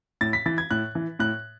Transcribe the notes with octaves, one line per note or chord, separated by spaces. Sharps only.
A2 A6
B6
E3 A6
G#6
A2 F#6
E3
A2 F#6